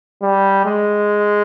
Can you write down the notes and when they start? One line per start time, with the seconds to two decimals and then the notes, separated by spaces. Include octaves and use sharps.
0.22 G3
0.65 G#3